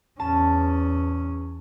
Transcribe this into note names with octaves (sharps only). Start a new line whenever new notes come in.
E2 C#4 A5